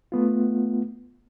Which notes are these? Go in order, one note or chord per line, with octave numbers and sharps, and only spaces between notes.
A3 B3 F4